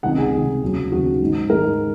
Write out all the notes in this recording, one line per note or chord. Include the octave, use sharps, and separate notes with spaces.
C#2 C3 D#3 F#5
G#4
C#2 C3 D#3
D#2 C#3 F#3
D#2 C#3 F#3 F#4
G#2 D#3 G#3
G#2 D#3 G#3 A#4